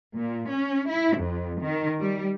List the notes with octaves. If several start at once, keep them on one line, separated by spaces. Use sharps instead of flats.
A#2
C#4
E4
F2
D#3
G3